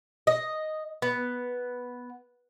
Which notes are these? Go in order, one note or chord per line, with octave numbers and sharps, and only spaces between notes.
D#5
B3